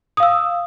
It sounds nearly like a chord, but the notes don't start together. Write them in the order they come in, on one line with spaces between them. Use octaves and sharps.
D#6 F5 E6